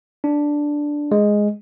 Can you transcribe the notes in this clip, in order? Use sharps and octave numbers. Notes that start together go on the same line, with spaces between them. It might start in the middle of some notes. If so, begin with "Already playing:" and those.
D4
G#3